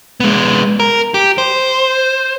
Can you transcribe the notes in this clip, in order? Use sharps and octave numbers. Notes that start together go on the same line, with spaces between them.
G#3 B3
A#4
G4
C5